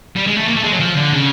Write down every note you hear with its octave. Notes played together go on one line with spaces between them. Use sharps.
G3
G#3
A3
A#3
A3
G#3
F#3
F3
D3
C#3